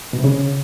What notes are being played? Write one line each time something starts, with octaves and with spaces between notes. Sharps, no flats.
B2
C3
C#3